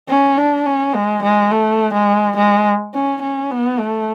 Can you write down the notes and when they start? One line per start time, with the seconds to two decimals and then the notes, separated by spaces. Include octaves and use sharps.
0.09 C#4
0.38 D4
0.66 C#4
0.95 G#3
1.23 G#3
1.51 A3
1.94 G#3
2.37 G#3
2.94 C#4
3.22 C#4
3.51 B3
3.79 A3